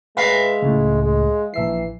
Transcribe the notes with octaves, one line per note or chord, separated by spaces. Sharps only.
G#3 B4 E5 F5
C#2 A2
G#3
A#1 E3 E5 C7